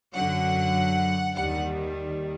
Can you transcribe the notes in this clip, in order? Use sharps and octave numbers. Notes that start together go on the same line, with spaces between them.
F#2 D3 F#3 F#5
D#2 D#3 G3 F#5